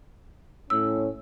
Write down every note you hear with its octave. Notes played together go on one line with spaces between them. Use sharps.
A2 C#4 E6